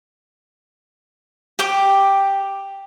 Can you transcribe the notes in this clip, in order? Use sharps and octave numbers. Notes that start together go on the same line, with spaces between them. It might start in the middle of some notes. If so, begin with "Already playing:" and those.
G4 G5 D6